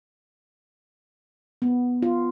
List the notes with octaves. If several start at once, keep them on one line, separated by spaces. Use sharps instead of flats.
B3
F4